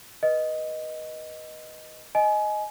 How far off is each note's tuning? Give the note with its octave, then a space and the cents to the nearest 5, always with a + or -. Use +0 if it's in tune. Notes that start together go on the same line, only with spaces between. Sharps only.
B4 -15 D#5 +0
D#5 +0 G#5 +25